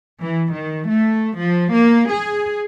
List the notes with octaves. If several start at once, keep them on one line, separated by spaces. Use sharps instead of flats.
E3
D#3
A3
F3
A#3
G#4